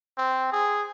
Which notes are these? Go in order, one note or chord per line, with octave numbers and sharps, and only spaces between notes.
C4
G#4